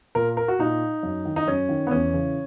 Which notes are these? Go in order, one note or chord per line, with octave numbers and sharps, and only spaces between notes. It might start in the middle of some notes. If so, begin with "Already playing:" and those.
A#2 A#4
A#4
F#4
A#2 D#4
F#2
D#3
D#4
F#2 C#4
D#3
B3
E2 C#4
C#3 E3